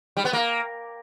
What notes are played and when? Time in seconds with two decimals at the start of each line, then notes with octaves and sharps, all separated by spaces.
0.17 G3
0.25 B3
0.33 A#3